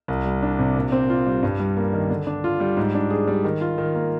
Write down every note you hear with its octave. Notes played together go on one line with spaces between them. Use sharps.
C2
G3
D4
C3
A#2
C4
F4
G3
G2
G3
A#3
D#3
D3
D4
F4
G3
G#2
D4
G#4
G3
D#3
F4
D#3
A#3